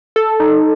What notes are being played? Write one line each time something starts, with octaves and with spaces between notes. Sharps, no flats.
A4
D#4